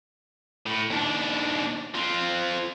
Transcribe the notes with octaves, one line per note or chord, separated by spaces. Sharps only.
A2
D#2 D4
F3 C4